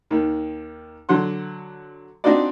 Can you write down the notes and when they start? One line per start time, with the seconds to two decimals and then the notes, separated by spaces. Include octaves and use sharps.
0.11 D#2 D#3
1.09 D3 F#3 F#5 C6
2.24 C4 D4 D#4 F4 F#4 D5